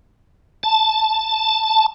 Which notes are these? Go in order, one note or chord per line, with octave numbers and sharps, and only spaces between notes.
A5